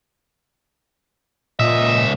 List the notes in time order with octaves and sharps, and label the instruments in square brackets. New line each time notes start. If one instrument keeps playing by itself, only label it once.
[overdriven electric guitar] C#2 E5 [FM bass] A#2 [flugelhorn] D#5